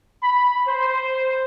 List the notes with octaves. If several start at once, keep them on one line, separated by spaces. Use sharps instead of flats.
B5
C5